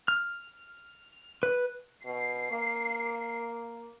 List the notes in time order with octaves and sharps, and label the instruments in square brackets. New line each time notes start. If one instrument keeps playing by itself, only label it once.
[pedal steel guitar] F6
B4
[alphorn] B2 [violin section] C7
[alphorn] A#3